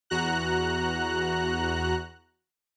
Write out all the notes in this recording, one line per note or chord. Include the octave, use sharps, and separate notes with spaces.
E2 F#4 A#5 F#6